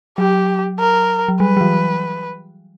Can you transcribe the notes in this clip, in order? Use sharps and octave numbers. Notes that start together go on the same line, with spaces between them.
F#3 G4
A#4
F#3
G3 B4
F#3
E3